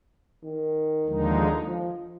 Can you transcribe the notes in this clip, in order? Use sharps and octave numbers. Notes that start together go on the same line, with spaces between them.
D#3
D#2 D3 F3 G#3 D#4
F3